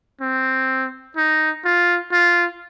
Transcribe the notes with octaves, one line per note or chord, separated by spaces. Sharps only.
C4
D#4
F4
F4